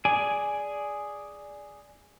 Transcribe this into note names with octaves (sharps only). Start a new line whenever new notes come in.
G#4 D5 G#5